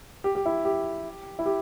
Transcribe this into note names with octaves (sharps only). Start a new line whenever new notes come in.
G4
G4
E4
G4
E4
G4